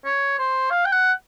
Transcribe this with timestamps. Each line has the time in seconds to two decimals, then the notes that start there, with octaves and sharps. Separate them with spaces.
0.05 C#5
0.39 C5
0.70 F5
0.85 G5
0.92 F#5